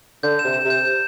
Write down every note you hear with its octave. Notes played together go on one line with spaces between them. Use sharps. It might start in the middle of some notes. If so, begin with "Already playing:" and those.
D3 G6
E7
C3
E7
C3
G6
G6